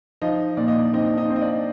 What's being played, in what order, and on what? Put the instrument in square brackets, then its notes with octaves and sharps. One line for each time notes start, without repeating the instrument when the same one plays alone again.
[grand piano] F3 [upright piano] D#4 D#5
[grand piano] A#2 [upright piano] D5
[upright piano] D#5
D4 D5
[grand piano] C4 [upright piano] D#4 D#5
[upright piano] D#4 D#5
[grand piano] C4
[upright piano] D#5
D4 D5